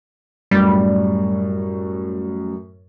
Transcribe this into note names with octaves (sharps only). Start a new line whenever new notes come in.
F#2 A2 G3